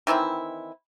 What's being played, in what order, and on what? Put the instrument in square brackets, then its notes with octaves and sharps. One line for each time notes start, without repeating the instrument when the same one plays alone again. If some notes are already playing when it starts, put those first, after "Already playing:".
[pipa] D#3 E3 C4 E4